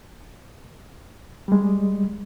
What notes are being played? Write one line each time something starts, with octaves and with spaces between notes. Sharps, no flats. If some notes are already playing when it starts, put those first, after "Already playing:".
G3 G#3